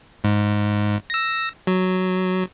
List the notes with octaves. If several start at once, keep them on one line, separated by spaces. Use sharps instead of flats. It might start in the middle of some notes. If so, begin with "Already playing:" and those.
G#2
E6 A#6
F#3